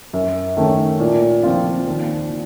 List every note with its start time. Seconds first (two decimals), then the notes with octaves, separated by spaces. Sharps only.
0.13 F#2
0.57 D#3 A3 C#4
1.00 A#2
1.43 F3 C4 F4
1.87 D#2
2.30 D#3